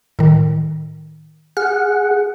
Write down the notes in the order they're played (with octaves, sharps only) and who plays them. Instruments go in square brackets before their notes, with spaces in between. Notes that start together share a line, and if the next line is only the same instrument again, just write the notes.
[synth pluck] A2 D#3
[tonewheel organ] G#4 F#5 [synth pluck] F6